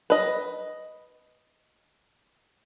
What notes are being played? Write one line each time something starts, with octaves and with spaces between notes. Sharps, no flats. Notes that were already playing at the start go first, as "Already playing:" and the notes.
B4 D#5